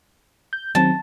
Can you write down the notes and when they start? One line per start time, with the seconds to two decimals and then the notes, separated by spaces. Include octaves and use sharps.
0.53 G6
0.75 D#3 F#3 C4 A5